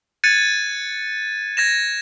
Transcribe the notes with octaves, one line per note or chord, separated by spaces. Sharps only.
F#6 G#6 A6 C#7 D#7
G#6 A#6 E7